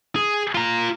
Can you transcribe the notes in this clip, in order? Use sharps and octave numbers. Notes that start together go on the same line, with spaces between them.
G#4
F4 A#5